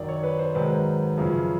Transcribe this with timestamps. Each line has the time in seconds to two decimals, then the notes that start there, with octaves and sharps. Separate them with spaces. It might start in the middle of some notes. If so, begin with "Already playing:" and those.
Already playing: F#2 D#3 F#3 D5
0.08 C#5
0.23 B4
0.39 C5
0.55 G#2 D#3 F#3 B4
1.17 F#2 C#3 F3